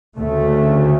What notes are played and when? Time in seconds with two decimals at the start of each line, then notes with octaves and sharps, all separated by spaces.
0.19 D2 C#3 A3